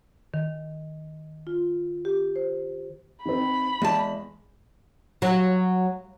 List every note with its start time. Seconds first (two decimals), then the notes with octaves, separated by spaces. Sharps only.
0.34 D#3
1.47 F4
2.05 G4
2.36 C5
3.26 D#3 C4 B5
3.82 E2 G#3 A5
5.22 F#3